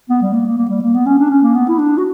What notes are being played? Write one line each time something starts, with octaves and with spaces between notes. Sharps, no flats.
B3
G3
A#3
A#3
A#3
G3
A#3
B3
C#4
D4
C#4
A#3
B3
E4
D4
F#4